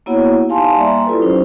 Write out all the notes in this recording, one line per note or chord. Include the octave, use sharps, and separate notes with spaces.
A#3 B3 E4 F#4 C#5 F#5
D#4 G4 F5 G#5 A5 C6
G3 A#3 D5 E5 A#5 C6
E4 F4 G4 A4 B4
F#3 C#4 D#4 G4 C5